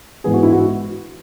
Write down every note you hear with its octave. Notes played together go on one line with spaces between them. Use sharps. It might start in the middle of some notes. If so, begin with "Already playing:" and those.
G#2 E3 B3 G#4
F#4
E4
F#4